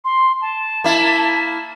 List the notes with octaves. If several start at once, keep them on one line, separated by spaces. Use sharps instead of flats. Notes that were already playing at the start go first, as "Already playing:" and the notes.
C6
A5
A#3 E4